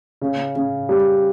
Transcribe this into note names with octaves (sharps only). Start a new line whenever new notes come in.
C#3
C#3
G3